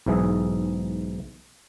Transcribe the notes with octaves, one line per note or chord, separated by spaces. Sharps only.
B1 G#2 E3 G#4 E5